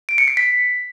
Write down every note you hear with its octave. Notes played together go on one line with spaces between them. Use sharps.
D7
C#7
C7
B6